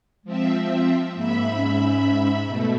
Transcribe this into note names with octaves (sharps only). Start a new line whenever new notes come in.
F3 G#3 C4 E5
G#2 A#3 E5 B5
C#4
B2 A3